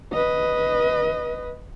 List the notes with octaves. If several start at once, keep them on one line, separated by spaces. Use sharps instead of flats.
B4 D#5